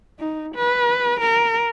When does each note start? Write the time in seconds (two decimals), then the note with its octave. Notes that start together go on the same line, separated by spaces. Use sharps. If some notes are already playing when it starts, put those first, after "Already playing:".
0.19 D#4
0.55 B4
1.20 A#4